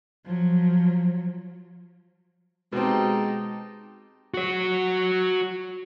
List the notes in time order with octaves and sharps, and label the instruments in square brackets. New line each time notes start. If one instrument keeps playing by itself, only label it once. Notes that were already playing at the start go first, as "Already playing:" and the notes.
[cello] F3 F#3
[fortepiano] B2 C4 [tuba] G#3 [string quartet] D#4 G4 A5
[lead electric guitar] F#4 C#5